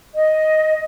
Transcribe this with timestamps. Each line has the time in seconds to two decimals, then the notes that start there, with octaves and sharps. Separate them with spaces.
0.15 D#5